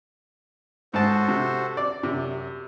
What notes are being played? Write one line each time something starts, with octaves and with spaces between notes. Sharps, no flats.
G#2 F#4 A4 C5 A5
C3
D5
F#2 C3